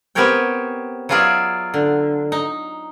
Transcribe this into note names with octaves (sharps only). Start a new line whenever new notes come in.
B3 C4 G4 A#4 C#5 G5
F#3 B3 F4 G#4 D5 E5
D3
D#4